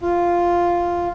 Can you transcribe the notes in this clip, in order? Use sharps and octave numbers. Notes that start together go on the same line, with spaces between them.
F4